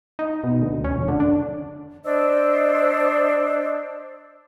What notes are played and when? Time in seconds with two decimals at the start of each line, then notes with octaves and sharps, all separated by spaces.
0.19 D#4
0.44 B2
0.62 D2
0.84 C#4
0.96 F1
1.08 D3
1.20 D4
2.04 D4 C5 D#5 E6